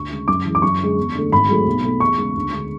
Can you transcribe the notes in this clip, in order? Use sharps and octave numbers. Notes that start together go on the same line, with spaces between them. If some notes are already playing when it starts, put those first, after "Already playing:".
Already playing: D2 C#6
C#3 G#3
F#2 D6
E3 G#3
D6
F#2 C#6
D3 G#3
E2
D3 A3
G#1 B5
G#2 F#3 A3
B1
B2 A3
E2 C#6
C#3 G#3
D2
D3 G#3